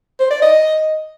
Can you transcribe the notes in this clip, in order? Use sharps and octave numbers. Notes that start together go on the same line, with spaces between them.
C5
D5
D#5